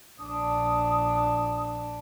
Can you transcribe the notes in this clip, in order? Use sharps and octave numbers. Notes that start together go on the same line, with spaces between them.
A#1 D4 D#6